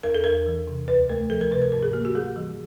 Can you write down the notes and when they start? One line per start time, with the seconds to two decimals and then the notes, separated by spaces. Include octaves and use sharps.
0.03 E2 A#4
0.15 A4
0.24 E2 A#4
0.46 E3
0.67 C3
0.88 D2 B4
1.09 A3 A#4
1.30 F3 A4
1.41 A#4
1.52 C3 B4
1.62 A#4
1.72 G#2 A#4
1.83 G#4
1.93 A#3 G4
2.05 F#4
2.15 G3 G#4
2.36 E3